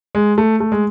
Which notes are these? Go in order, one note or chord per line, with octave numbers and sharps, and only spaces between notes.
G#3
A3
A3
G#3